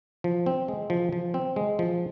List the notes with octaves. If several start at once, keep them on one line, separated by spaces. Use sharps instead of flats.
F3
C4
G#3
F3
F3
C4
G#3
F3